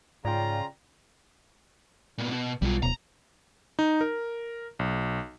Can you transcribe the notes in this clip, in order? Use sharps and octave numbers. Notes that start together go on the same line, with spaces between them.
G#2 C#3 C#4 F4 D5 G5 A#5
A#2 B3
B2
B1 G3 F4
D1 B2 A#5
D#4
A#4
B1